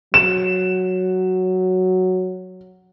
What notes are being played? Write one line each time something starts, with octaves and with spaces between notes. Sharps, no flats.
F#3 E7